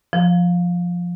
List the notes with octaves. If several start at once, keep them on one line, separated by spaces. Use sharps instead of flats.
F3